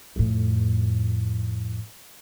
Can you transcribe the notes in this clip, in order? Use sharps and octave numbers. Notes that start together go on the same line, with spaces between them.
F2 A2